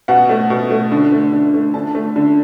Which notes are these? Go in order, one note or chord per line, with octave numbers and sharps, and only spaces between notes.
B2 F#5
A3
B2
A3
D3
A3
D3
A3
D3 A5
A3
D3